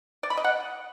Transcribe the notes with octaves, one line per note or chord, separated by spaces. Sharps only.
D5
B5
D#5
F#5